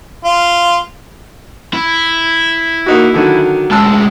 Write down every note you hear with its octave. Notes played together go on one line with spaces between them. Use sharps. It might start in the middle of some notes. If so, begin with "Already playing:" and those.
F4
E4
A#3 D#4 F#4
D3 D#3 F#3
D2 G#3 A5 E6